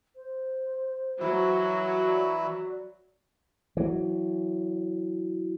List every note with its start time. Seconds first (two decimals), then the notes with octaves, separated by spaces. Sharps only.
0.16 C5
1.21 E3 F#3 B4 E5
2.07 D5
3.77 E3 F#3